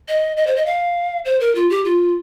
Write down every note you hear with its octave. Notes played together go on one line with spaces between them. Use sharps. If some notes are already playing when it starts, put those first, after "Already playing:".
D#5
D#5
C5
D#5
F5
C5
A#4
F4
G4
F4